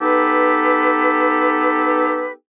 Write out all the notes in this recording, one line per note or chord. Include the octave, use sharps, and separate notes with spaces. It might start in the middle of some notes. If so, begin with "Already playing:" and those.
B3 D#4 G4 A4 B4